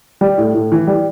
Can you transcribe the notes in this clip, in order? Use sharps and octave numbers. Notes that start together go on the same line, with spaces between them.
G3
A2
A2
E3
G3